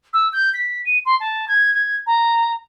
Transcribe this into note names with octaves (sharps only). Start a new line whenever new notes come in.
E6
G6
B6
D#7
C6
A5
G#6
G#6
A#5